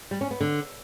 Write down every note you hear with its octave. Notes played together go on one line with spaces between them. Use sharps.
G3
C#4
B3
D3